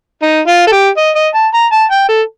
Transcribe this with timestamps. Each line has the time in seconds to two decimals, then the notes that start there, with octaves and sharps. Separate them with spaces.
0.22 D#4
0.47 F4
0.67 A4
0.72 G4
0.97 D#5
1.15 D#5
1.34 A5
1.54 A#5
1.72 A5
1.91 G5
2.08 A4